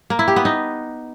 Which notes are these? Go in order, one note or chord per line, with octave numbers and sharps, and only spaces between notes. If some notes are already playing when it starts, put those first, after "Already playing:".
A#3
E4
G4
B3
D#4